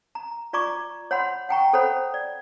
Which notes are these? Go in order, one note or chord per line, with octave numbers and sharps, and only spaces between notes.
A#5
F4 D5 A#5 C#6 D6
C#5 F#5 B5 C6
F#5 G5 A#5 C#6
A4 C5 C#5 F#5 B5
D5